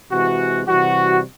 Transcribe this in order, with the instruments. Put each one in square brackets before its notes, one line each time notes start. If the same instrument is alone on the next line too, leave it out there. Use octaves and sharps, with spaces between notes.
[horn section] C3 E3 G#3 F#4
C3 E3 G3 F#4